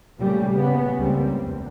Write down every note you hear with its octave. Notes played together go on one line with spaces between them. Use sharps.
A#2 C#3 G3 A3
A#2 C#3 B3
C#2 G3 A#3 C4
E2